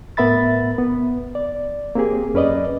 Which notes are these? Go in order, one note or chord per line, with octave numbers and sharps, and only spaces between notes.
A2 B3 A#4 E5 B5 A6
B3
D5
A#3 C4 G4 G#4
F#2 C#4 B4 D5 D#5